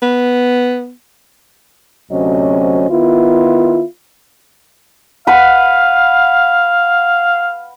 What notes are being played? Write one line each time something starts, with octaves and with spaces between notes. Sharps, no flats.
B3
D2 C3 F#3 C#4 C5 D#5
D#3 B3 E4 F4
B4 F5 F#5